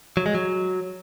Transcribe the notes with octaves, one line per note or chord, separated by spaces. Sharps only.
F#3
G#3
F#3